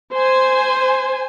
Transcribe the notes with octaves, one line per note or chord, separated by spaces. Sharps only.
C5 G#5